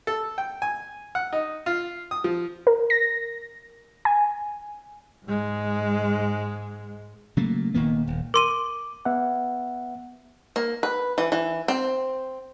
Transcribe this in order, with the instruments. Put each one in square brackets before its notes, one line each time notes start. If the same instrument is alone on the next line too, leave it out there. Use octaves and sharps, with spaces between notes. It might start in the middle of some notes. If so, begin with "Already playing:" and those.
[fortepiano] A4
G5
G#5
F#5
D#4
F4
D#6
F3
[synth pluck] A#4
A#6
G#5
[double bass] G#2 G#3
[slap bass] C#3 F#3 A3 A#3
D#1 D#3 A#3 B3
D#1
[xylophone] A#4 C6 D#7 [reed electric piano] D6
[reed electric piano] B3 E5 F#5
[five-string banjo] A#3
B4
E3
E3
C4